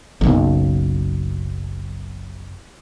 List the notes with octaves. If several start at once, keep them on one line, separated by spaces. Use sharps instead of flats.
F#1 B1